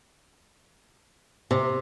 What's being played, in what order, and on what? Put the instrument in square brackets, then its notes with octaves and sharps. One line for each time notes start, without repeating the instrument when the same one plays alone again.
[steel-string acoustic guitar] C3